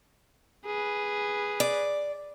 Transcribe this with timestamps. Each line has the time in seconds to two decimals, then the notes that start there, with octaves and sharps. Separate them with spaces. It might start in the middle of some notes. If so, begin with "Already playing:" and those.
0.66 G#4 B4
1.60 D5